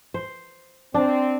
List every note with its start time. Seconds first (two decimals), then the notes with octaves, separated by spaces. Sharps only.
0.14 C5
0.94 C4 D4